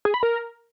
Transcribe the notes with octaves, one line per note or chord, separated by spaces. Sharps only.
G#4
B5
A#4